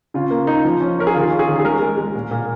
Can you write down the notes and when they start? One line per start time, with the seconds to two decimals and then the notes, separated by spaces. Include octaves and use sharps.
0.14 C#3 F4
0.31 A#3
0.47 D#4
0.65 F3
0.81 C#4
0.98 C#4 A#4
1.07 G#4
1.14 D#3 F4
1.31 C#4
1.39 G#4
1.48 D#3
1.59 G#4
1.65 G#3 A#4
1.81 G#3
1.98 G#3
2.15 A#2
2.31 A#2